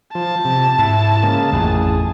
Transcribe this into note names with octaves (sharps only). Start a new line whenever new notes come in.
F3 A5
C3
G#2 E4
C#3 G#3 A#3
A1 F2 G#4